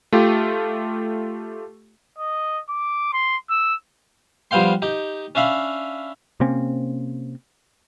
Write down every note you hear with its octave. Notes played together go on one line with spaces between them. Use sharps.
A3 F4 G4
D#5
D6
C6
E6
F3 G3 B3 F5 G5 C6
D#4 G4
C#4 D4 E5 F5 B5
C3 A#3 C4 C#4